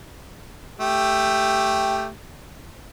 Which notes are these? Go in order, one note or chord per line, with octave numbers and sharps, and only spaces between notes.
A3 G4